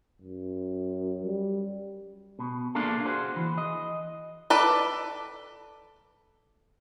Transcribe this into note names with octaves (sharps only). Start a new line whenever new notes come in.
F#2
G3
B2
A#3 D4 F4 G#4 A4
F#4 G#4 C5
E3
D#5
A4 B4 D5